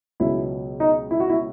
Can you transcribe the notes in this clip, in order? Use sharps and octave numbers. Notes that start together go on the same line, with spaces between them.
C#2 B2 F#3 E4
D#4
E4
F#4
E4